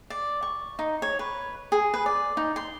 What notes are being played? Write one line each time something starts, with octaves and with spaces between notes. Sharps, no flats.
D5
C#6
D#4
C#5
B4
G#4
B4
D5
D#4
C6